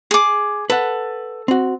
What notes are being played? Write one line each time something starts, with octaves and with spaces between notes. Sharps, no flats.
G#4 D6
A4 B4 F#5
C4 F#4